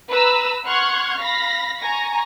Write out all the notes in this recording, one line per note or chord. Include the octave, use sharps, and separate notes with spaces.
B4 A#5 B5 E6
F#5 C6 C#6 F6 F#6 G#6
F5 B5 A#6 B6
G#5 A#5 C#6 A#6